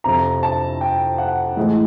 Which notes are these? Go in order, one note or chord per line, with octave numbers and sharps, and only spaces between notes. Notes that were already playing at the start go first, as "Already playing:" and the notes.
F2 C3 F3 A#5
A5
G5
F#5
A2 E3 G#3